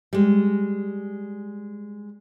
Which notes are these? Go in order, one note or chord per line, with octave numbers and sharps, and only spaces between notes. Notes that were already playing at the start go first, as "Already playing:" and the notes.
G3 G#3